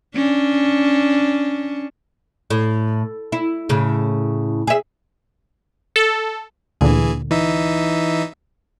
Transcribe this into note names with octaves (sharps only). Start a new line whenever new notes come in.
C#4 D4
A2
E4
A2 C#3
G#4 E5
A4
D2 A#2 D3 E3 G#4
E3 D#4 E5